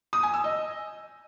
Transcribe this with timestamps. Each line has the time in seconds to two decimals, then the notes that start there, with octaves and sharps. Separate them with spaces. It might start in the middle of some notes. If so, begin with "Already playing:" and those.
0.13 D#6
0.23 G#5
0.34 E6
0.44 D#5